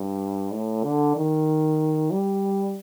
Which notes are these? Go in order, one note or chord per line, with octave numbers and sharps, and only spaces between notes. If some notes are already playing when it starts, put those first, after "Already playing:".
Already playing: G2
A2
D3
D#3
G3